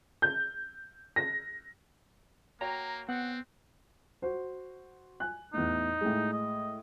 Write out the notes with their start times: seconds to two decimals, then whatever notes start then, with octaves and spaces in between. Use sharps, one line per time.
0.22 G6
1.16 A#6
2.61 A#3 F#4 C#5 G5 A#5
3.09 B3 C4 F#5 F#6
4.22 F#4 C5
5.20 G#5 F#6
5.54 E2 A2 D#4
6.01 A2 G#3
6.33 D#5